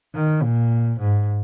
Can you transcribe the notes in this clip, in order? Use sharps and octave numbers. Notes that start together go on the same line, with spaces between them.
D#3
A#2
G#2